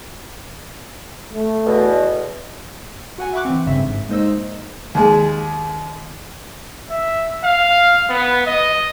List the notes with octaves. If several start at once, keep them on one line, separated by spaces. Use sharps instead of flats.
A3
E2 B2
F#4 F#5 G#5
E5 F#5 B5 C#6 D6 F#6
E3 C4
G#1 G2 C#3 C4 E5
G#2
G#3 A#3 D#4 C5 D#5 E6
D#2 G#3
E5
F5
B3
D#5